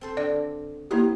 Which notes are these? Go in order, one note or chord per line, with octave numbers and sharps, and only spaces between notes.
C4 A4 C5
D3 D5
A#3 C4 D#4 E4 G4 B4